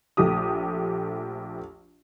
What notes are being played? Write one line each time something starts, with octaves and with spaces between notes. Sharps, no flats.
A#1 A3 G4 D#6